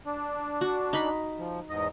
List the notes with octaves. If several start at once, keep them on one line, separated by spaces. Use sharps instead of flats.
D4
F#4
D#4 B5
F3
E2 G#2 D#5